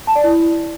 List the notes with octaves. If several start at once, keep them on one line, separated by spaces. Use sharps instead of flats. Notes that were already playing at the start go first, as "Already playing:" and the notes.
A5
D5
E4